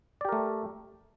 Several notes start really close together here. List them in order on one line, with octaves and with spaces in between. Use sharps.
D5 G4 A#4 A3